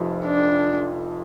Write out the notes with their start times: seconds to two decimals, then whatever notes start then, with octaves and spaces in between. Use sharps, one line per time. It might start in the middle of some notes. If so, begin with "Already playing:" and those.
Already playing: F1 F2 F3 C4 G4
0.26 D4